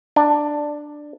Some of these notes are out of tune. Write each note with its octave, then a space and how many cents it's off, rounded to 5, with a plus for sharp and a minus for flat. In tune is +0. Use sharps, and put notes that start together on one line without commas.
D4 +10